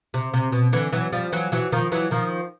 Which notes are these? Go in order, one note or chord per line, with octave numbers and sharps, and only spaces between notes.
C3
C3
B2
D3 E3
E3 F#3
F3 G3
E3 F#3
E3 F#3
D#3 F3
E3 F#3
D#3 F3